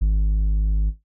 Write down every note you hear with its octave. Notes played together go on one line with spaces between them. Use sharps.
G#1